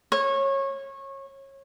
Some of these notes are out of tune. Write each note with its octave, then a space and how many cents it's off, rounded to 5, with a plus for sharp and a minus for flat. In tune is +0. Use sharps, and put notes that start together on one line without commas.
C#5 -25